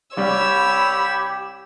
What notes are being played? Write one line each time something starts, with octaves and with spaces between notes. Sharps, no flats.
C2 G3 G4 C#5 B5 E6